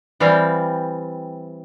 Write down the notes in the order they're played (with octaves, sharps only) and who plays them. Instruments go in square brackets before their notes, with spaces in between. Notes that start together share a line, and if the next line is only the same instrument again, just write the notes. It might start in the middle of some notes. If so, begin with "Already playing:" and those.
[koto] E3 G3 C4 F5